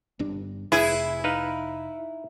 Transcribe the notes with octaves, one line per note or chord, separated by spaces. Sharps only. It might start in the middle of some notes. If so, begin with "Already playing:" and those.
G1 G2 D4
F1 E4 G#4 B4
D#4 B4 F5